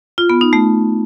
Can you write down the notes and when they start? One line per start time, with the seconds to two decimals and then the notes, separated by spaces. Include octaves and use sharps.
0.18 F4
0.30 B3
0.41 D#4
0.53 A3